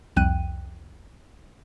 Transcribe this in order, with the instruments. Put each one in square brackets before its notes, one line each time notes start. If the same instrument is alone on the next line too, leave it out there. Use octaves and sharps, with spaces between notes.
[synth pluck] C2 F2 G5 F#6 D#7